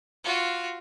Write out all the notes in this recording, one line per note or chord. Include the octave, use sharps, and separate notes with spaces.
F4 F#4